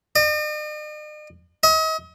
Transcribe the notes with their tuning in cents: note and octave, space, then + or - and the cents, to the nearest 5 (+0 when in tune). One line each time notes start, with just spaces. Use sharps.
D#5 -45
D#5 +40